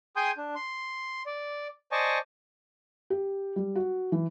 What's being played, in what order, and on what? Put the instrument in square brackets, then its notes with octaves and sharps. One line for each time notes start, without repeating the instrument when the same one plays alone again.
[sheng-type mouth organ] G#4 G5 G#5 C6 D#6 G6
D4
C6
D5
C5 D5 D#5 G#5 A5 C#6
[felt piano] G4
G3
F#4
E3